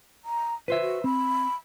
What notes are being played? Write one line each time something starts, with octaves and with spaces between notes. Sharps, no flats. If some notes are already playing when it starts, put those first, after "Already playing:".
A#5
F4 B4 C5 E5
F#4
C4 B5